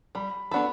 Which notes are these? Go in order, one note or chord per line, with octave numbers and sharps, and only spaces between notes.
G3 B5
B3 D4 F#4 A4 B5